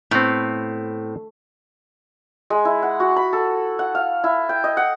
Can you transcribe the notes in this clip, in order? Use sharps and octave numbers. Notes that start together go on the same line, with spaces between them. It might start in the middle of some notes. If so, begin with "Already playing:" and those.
A2 B3 C4
G#3
E4
F#5
F#4
B5
A4
F#5
F5
E4
G5
D#5
F#5